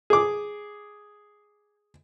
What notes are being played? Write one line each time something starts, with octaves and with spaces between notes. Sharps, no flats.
G#4 D6